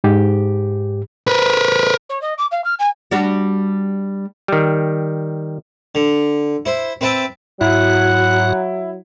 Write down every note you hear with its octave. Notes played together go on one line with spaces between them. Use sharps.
G#2 G4
A#4 B4
C#5
D#5
D6
F5
F6
G#5
G3 D4 F#4
D#3 G3
D3
E4 C5
C4 B4 E5 G5 A5
G#2 F#3 E4 F#4 F#5